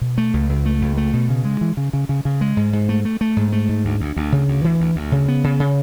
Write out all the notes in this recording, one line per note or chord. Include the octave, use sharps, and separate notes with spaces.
B2
A3
C#2
C#2
A3
C#2
A3
B2
C#3
G#3
E3
C#3
C#3
C#3
C#3
G#3
G#2
G#2
A3
A3
A3
G#2
A3
G#2
D2
D2
D2
C#3
D2
E3
D2
D2
C#3
B3
C#3
C#3